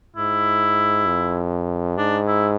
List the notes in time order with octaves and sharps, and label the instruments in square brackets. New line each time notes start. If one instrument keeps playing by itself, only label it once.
[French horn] G#2 [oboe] E4
[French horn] F2
[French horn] G#2 [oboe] D4
[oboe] E4